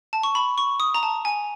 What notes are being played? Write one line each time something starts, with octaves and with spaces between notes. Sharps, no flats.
A5
C#6
B5
C#6
D#6
A#5
A5
G#5